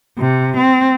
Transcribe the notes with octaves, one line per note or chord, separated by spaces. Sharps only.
C3
C4